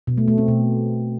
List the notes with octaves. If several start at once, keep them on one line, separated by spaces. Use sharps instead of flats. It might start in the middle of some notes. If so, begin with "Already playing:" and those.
B2
A3
A3
C4
B2